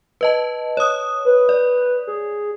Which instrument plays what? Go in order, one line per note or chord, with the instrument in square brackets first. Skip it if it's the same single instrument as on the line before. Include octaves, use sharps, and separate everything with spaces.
[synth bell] B4 D#5 A5
C#5 D#6
[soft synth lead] B4
[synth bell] D5
[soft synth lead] G#4